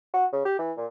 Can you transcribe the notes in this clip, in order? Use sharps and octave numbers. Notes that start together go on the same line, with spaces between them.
F#4
C#3
G4
E3
A#2